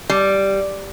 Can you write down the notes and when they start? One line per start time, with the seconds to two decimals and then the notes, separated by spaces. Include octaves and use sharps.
0.10 G3